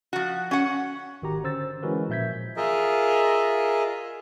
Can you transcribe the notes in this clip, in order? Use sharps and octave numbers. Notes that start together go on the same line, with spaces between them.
F3 F#4
C#4 F#5
G#1 D#3 F#4 G4 A#5
D3 C#4 C5 E6 A6
E3 G#3 C#4 F#4 A#4 B4
A#2 F3 E5 G6 G#6 B6
F4 G#4 A#4 D#5 E5